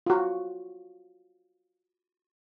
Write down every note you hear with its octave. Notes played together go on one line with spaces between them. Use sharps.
F4 F#4